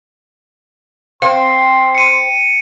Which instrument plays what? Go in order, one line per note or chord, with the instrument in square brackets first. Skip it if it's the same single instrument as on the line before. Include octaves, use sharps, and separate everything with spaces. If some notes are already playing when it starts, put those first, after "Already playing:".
[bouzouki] C4 [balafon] F5 [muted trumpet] C6
[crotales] C#7 D#7